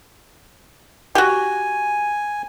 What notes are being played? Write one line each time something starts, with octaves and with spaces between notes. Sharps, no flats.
F#4 G4 G#5